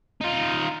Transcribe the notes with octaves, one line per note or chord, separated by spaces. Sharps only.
D#4 F4